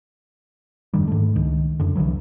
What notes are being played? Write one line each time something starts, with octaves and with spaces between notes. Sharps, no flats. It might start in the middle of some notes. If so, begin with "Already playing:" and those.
F1 G2 D#3 G3
G#2 A3
C#2 D#3
F1 F#2 D3
C2 D3 E3 F#3